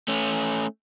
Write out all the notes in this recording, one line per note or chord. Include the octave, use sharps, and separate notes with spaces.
A3 C#4